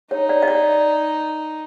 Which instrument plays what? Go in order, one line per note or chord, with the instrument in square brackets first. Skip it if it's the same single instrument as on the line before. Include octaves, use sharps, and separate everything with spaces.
[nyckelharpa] D#4 [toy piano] C#5
[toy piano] D5
D#5
D5